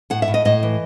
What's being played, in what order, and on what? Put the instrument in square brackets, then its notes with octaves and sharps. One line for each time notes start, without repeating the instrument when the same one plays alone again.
[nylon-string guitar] A2 F#5
E5
A2
D#5
A2 D#5
E3